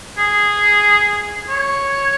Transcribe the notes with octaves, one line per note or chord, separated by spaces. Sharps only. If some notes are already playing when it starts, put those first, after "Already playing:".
G#4
C#5